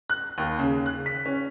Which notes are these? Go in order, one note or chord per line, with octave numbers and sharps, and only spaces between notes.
F#6
D#2
C#3
F#6
B6
C#4